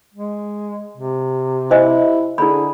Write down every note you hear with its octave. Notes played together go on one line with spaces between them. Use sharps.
G#3
C3
E4 C5 D#5 G#5
D3 E4 G#4 B5